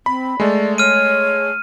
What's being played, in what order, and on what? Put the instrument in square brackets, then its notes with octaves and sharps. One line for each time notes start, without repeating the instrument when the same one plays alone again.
[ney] C4 [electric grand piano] B5
[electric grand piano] G#3 A3 [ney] D5
[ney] C#5 [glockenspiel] F6 D#7